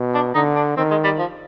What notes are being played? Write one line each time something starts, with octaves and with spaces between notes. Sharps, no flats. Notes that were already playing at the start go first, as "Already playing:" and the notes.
Already playing: B2
D4
D3 D#4
D4
D#3 C4
G#3
G3
F3